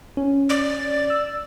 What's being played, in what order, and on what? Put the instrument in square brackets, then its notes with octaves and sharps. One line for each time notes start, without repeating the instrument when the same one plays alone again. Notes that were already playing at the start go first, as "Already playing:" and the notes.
[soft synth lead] C#4
[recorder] D5
[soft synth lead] E6